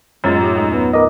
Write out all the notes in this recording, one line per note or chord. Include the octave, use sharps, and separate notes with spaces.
F#2 A2 F#3 G#3 F4
A3 D#4 G4
D#2 G#3 D#4
B3
D3 B3 A#4 D#5 D6